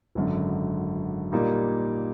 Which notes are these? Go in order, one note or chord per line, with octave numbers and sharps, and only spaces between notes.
G#1 F#2 D3
A#2 G3 A#3 D#4